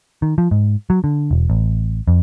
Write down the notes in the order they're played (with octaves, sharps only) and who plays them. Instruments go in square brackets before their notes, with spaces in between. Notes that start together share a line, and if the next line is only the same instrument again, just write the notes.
[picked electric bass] D#3
F3
G#2
F#3
D3
E1
A1
F2